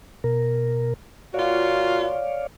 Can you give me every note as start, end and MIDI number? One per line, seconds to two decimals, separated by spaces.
0.24 0.94 47
0.24 0.94 70
1.34 2.14 46
1.34 2.14 65
1.34 2.14 66
1.34 2.47 73
1.34 2.47 74
1.34 2.47 77